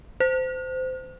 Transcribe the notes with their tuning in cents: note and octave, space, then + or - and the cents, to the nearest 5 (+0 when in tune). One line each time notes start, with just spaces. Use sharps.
C5 -25